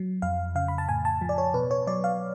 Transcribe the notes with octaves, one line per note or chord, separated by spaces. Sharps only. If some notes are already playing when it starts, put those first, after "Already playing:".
Already playing: F#3
F2 F5
C#3 F5
B5
A5
A2 G#5
A5
F3
D5
C#5
B2 B4
C#5
F#3 D5
F5